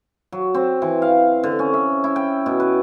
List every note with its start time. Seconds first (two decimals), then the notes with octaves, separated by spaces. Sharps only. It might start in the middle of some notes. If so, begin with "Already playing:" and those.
0.32 F#3
0.54 C4
0.82 E3
1.02 F5
1.43 D3
1.59 C#4
1.74 E5
2.04 E4
2.16 G5
2.46 B2
2.60 B4